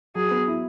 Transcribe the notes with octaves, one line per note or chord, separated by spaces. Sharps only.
F#3 G#4
B3
E4